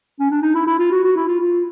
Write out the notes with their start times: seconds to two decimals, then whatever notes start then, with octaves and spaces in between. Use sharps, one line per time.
0.19 C#4
0.31 D4
0.42 D#4
0.55 E4
0.67 E4
0.79 F4
0.92 F#4
1.04 F#4
1.16 E4
1.28 F4
1.41 F4